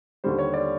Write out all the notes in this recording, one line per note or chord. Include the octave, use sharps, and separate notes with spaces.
D#2 D3 G3 C5
C#5
D5